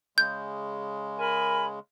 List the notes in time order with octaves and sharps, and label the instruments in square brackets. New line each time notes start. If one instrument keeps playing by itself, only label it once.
[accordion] C#3 G#3 [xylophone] G6
[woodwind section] A#4 G#5 B5